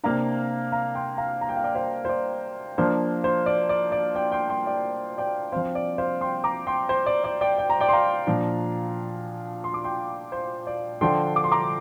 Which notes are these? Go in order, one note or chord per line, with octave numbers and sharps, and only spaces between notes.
C3 A#3 D4 F5 A#5
F5 A#5
G5 C6
F5 A#5
A#5
G5
F5
D5 G5
C5 F5
C5
D5
F3 A#3 D4 C5
C5
D5
D5
D5
D5 G5
G5 C6
G5 C6
D5 G5
D5 G5
F3 C4 C5 F5
D5
C5 F5
G5 C6
A#5 D6
G5 C6
C5
D5
D5
D5 G5
G5
A#5
D5 G5
C6
F5 A#5
A#2 F3 D4
C6
D6
G5 C6
C5
D5
D3 F3 D4 G5 C6
D6
C6
A#5 D6